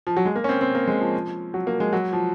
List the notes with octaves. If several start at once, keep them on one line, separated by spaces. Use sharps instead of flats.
F3
F#3
G#3
A#3
C#4
C4
C4
A#3
G#3
F3
F#3
A#3
G#3
F#3
F3